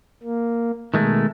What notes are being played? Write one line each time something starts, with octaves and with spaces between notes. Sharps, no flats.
A#3
B2 D#3 G#3 A3